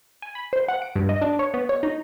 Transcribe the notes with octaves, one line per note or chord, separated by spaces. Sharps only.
G#5
B5
C5
F#5
D7
G2
D#5
D4
C#5
B3
C#5
D#4